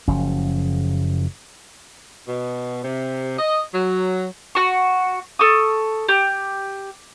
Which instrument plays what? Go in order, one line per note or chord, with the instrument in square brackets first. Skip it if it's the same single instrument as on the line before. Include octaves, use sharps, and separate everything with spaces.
[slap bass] F#1 F3 C#4
[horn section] B2
C3
D#5
F#3
[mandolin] F#4 C#6
A4 C#6 D#6
G4